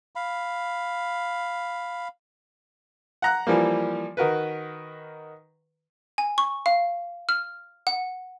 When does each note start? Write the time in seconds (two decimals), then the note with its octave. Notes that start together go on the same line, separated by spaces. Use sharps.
0.16 F5 B5
3.22 F#5 A#5 F#6
3.47 E3 F3 G3 A#3
4.17 D#3 F#4 A#4 B4
6.18 G#5
6.38 C#6
6.66 F5
7.29 F6
7.87 F#5